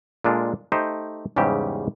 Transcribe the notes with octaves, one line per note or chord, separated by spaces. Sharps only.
A#2 G#3 D4 F4 A4
A3 D#4 G4 C5
E2 G#2 C#3 G3 G4 E5